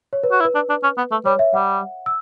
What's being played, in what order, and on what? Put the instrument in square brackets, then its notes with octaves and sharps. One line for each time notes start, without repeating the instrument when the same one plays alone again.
[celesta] C#5
B4
[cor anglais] F#4
E4
[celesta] B4
[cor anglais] D4
D4
C#4
B3
A3
[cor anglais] G3 [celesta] C#5
[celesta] E5
[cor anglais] G3 [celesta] F#5
[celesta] E6